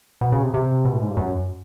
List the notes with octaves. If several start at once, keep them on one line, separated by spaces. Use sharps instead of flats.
B2
C#3
C3
C3
B2
A2
G#2
G2
F#2